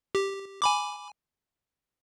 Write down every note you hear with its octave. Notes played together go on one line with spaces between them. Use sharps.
G4
G#5 B5 D6